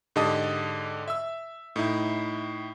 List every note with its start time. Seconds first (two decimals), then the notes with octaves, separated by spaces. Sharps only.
0.16 G#2 D3 G4 D#5 A5 D#6
1.08 E5 E6
1.76 A2 D#4 E4